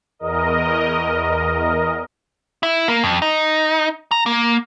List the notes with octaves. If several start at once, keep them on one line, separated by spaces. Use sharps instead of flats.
E2 A#4 D#5
E4
A#3
F2
D#4
A#5
A#3